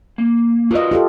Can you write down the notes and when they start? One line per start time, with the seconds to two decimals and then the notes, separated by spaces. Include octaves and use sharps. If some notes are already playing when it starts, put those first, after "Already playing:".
0.18 A#3
0.71 F4 F#4 A#4 B4 D#5
0.91 F4 G4 A4